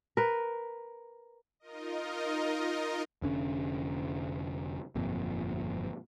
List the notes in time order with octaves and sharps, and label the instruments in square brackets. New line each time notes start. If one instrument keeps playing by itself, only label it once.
[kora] A#4 B4
[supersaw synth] D#4 F4 A#4 D#5
[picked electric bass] F1 D3 C#4
G1 F2 A#2